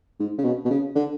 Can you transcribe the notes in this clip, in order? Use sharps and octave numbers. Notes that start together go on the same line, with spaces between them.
G#2
C#3
B2
B2
C#3
D3